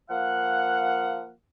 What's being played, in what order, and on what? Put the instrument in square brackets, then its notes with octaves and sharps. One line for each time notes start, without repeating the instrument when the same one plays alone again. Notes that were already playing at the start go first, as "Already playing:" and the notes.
[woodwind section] F3 A#3 F5 F#5